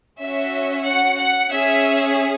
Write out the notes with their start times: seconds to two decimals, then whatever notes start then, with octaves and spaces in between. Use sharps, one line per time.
0.20 C#4 F#4 E5
0.86 F#5
1.20 F#5
1.52 C#4 G#4 E5